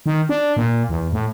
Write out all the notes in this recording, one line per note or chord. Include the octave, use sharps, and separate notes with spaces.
D#3
D4
A#2
E2
A2